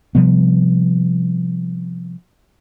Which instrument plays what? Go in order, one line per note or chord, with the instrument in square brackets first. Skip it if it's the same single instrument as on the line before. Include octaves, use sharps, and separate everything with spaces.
[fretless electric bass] C3 F3 G3 B3